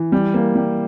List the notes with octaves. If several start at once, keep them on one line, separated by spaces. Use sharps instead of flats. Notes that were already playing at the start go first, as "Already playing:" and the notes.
Already playing: E3
G3
A#3
G3